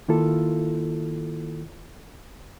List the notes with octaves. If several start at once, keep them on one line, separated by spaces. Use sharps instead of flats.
D#3 A#3 E4 F4 A4